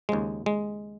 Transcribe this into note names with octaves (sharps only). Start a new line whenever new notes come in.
D#2 C#3 F3 G#3
G#3